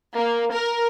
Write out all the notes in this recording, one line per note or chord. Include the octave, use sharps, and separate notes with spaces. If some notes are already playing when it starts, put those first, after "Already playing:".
A#3
A#4